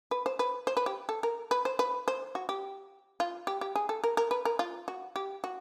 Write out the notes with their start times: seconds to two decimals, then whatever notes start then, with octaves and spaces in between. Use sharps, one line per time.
0.11 B4
0.26 C5
0.39 B4
0.67 C5
0.77 B4
0.86 G4
1.09 A4
1.23 A#4
1.51 B4
1.65 C5
1.79 B4
2.08 C5
2.35 F#4
2.49 G4
3.20 F4
3.47 G4
3.61 G4
3.76 G#4
3.89 A4
4.04 A#4
4.17 A#4
4.31 B4
4.45 A#4
4.59 F4
4.88 F#4
5.16 G4
5.44 F#4